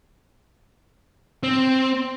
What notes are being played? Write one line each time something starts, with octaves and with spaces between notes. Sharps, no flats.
C4